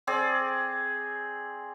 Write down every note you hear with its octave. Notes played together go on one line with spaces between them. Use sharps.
C4 G#4 D5